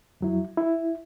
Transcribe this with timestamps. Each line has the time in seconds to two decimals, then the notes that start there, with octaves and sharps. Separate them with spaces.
0.21 F2 F#3 E4
0.57 E4